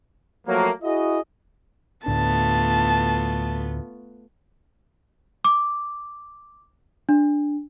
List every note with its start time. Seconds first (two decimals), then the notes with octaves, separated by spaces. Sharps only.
0.47 F3 F#3 A3 A#3
0.82 E4 F#4 G#4 D#5
2.06 D2 A2 A3 B3 D4 F4 A5
5.45 D6
7.09 D4